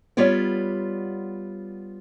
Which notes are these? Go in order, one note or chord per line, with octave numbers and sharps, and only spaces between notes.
G3 B3 F4 C#5 D5